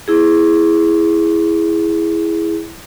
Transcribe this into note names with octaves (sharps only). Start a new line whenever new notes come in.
E4 G#4